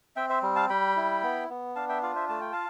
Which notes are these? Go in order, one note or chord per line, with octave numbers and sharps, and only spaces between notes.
C4 E5 G5
C5 E5
G3
F5 A5
G3 G5 B5
E4
B3
B3
D4 F5 A5
E5 G5
F4 D5 F5
C5 E5
A3 A5
G5
F5 A5